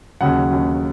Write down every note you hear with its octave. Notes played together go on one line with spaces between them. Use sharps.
D#2 C#3 F#3 F#5
D#2 C#3 F#3